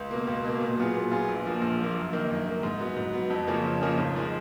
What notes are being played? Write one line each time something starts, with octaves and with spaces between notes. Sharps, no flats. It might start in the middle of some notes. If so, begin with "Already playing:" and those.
Already playing: C#2
B2 A#3
C#2
B2 A#3
A#2
F#3 B3 F4 G#4
A#2
F#3 B3 F4 G#4
A#1
A#2 F3 A#3
A#1
A#2 F3 A#3
F#2
D#3 A#3
F#2
D#3 A#3
G#2
F#3 B3
G#2
F#3 B3
F2
C#3 F3 A#3 C#4
F2
C#3 F3 A#3 C#4
G#1
F3 G#3